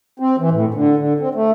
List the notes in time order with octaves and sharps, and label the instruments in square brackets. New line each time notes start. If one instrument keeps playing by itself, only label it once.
[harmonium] C4
E3
A2
D3
D3
C4
A3